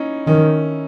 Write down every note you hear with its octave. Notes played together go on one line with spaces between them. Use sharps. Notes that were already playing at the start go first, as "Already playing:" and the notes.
Already playing: C#4 D#4 E4
D#3 C#4